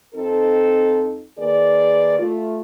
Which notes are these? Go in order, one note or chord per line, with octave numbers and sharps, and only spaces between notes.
F2 C4 D#4 A4
D#3 A#3 G#4 B4 D5
A3 F4